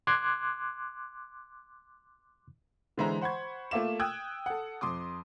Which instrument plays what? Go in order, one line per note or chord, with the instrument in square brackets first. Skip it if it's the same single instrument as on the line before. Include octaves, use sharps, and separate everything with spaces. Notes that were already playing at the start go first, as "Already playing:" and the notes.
[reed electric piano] C6 D6 F#6 G#6
[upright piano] D3 E3 G#3 C5 E5 A#5
C5 F#5 B5 C#6 G#6
A3 A#3 F4 E5 D6 E7
G5 D#6 E6 F#6 G#6
A4 F#5
F2 C6 D6 D#6